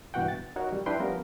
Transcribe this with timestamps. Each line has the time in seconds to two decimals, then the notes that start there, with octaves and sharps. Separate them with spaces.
0.14 G2 B2 E3 F#4 F#5 G5
0.28 A6
0.56 D#4 F#4 A#4 C#5
0.72 F2 G3
0.86 D4 E4 B4 G5 C6
0.99 F3 G3 B3 C#4 F4 A#4